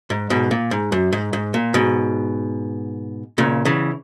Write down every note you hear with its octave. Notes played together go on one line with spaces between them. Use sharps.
G#2
G#2 B2
A#2
G#2
F#2
G#2
G#2
A#2
G#2 B2
A#2 C#3
C#3 E3